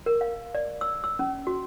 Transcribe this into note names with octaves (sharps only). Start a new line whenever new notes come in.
A#4
F5
D5
E6
E6
C#4
F#4